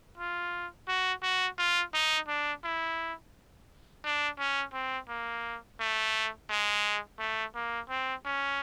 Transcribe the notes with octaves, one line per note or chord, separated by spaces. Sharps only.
F4
F#4
F#4
F4
D#4
D4
E4
D4
C#4
C4
A#3
A3
G#3
A3
A#3
C4
C#4